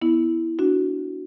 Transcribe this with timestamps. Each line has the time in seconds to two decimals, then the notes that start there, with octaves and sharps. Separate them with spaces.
0.02 B3 E4
0.59 D4 F#4